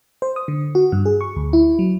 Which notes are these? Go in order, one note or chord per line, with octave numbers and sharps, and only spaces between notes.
C5
D#6
D3
F#4
G2
G#4
C#6
D2
E4
F#3